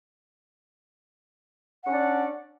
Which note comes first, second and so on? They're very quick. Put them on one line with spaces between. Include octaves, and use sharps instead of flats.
F#5 C#4 D4 D5